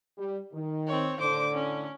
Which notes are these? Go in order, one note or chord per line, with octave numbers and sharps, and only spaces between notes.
G3
D#3
C4 C#5
A2 D3 C5 D6
C#4